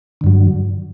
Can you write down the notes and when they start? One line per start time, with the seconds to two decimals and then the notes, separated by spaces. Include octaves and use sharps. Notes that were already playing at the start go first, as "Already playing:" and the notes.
0.21 D3
0.24 G2
0.27 F#3